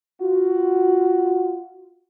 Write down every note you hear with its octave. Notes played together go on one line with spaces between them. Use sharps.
F4 F#4